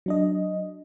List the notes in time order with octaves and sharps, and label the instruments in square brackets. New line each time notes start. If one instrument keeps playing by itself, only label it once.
[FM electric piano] F#3 D4 D#5